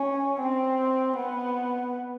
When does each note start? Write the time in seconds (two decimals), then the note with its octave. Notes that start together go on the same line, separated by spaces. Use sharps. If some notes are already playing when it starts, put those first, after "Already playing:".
Already playing: C#4
0.40 C4
1.17 B3